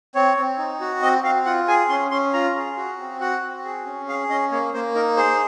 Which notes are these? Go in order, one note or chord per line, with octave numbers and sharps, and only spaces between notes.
C4 C#5
C4
D#4
F#4
C4 D#5
C4 F5
F4 F#5
G#4 G#5
C#4 C6
C#4 C6
F4 A#5
G#4
F#4
C4
F#4 F#5
C4
G#4
C#4
G#4 F5
C#4 D#5
A#3 C#5
A#3 C5
D#4 A#4
G#4 C5